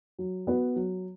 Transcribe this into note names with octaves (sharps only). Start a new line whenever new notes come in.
F#3
B3 F#4 B4
F#3